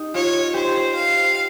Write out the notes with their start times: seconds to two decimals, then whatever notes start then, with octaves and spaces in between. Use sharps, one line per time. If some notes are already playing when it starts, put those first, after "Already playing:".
Already playing: D#4 G4
0.14 F4 C#5
0.54 G4 C5
0.94 F5